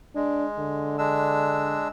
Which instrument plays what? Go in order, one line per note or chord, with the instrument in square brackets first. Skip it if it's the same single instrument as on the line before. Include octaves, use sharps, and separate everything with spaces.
[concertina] G#3 [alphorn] D4
[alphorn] D3
[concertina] G#3 D4 E6